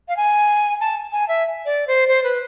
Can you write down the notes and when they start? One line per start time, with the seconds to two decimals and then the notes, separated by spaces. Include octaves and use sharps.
0.08 F5
0.17 G#5
0.80 A5
1.12 G#5
1.28 E5
1.65 D5
1.87 C5
2.08 C5
2.24 B4